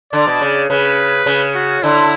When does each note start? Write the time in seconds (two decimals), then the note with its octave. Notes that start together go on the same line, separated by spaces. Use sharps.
0.13 D3 D5
0.27 B2
0.41 C#3
0.70 C#3 B4
1.26 C#3
1.55 F#4
1.83 D3 E4